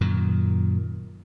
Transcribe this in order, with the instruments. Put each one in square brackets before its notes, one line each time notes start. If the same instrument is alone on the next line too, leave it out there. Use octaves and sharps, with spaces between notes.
[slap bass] F#2 A#2 D#3